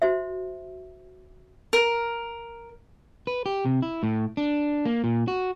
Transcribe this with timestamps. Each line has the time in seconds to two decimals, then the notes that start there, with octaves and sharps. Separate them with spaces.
0.02 F#4 C5 E5
1.73 A#4
3.27 B4
3.46 G4
3.65 C3
3.82 E4
4.03 A2
4.37 D4
4.85 A#3
5.04 A#2
5.28 F#4